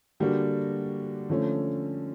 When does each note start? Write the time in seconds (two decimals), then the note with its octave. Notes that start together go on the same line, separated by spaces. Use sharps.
0.20 D3 G3 A#3 D4 F#4
1.30 D3 F3 A3 C#4